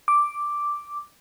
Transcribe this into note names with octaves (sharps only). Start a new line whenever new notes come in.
D6